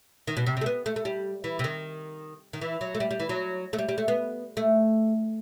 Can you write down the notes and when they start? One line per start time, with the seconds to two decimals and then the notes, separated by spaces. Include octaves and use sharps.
0.27 D#3
0.37 B2
0.47 C3
0.57 C3
0.61 A3
0.66 B3
0.86 A3
0.96 A3
1.05 G3
1.44 E3
1.59 C3
1.64 D#3
2.53 D#3
2.62 E3
2.81 F#3
2.95 A3
3.00 G3
3.11 G3
3.20 E3
3.29 F#3
3.73 A3
3.79 G3
3.89 G3
3.98 A3
4.08 B3
4.57 A3